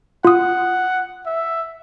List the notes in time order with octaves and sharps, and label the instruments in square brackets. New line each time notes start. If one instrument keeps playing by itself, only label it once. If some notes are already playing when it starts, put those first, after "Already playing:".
[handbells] F4 D#6 [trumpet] F#5
[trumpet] E5